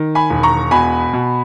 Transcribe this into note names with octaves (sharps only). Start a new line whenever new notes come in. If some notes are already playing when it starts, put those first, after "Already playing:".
Already playing: D#3
G#5 B5
E1
A#5 C#6
B2 G#5 B5
B2